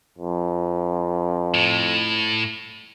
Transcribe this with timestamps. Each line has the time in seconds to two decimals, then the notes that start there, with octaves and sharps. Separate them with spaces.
0.18 F2
1.55 A2